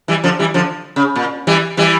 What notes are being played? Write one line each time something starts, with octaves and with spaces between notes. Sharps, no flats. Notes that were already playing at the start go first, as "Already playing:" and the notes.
E3 G3
D3 F3
E3 G3
D3 F3
C#3
A#2
E3 G3
E3 G3